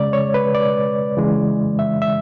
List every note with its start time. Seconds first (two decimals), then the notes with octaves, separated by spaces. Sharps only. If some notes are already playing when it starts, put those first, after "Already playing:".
Already playing: C#3 G#3 D5
0.13 C#5
0.34 B4
0.55 D5
1.17 C#3 E3 G#3
1.79 E5
2.02 E5